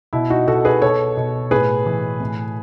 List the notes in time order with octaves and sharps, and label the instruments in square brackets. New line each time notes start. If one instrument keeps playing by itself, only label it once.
[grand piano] B2 E4
D#4 F#4
B2 F#4 A4
G#4 B4
B2 A4 C#5
B2
A2 G#4 B4
E3
A2